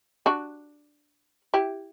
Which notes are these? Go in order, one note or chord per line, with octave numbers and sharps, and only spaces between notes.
D4 F#4
E4 G4